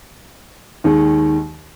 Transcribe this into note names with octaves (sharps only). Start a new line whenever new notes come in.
D#2 D#3 G#3